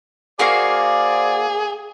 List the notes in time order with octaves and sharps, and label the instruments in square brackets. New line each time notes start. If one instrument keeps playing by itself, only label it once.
[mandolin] A#3 F#4 F5 [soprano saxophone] G#4 [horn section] C5 D5